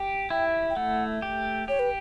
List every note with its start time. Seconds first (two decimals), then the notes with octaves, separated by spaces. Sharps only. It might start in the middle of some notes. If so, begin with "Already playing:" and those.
Already playing: G4
0.30 E4 G5
0.70 G5
0.76 A3 F#5
1.22 G4
1.68 G4 C#5
1.79 B4